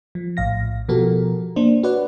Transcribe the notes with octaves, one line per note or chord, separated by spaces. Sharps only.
F3
A#1 A2 F5 A#6
B2 F3 F#4 G4 A4 A#4
A#3 D4 C5
F#4 B4 C#5 D5 F#5